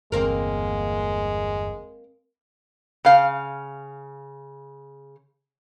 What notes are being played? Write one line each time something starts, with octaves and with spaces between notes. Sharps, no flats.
G1 E2 G#3 A#3 C4 A#4
C#3 F5